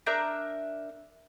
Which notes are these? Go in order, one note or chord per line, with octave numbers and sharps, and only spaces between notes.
D4 A#4 E5 G6